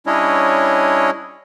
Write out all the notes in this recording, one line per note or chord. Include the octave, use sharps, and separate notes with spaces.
G3 C#4 D4 E4 C#5 D#5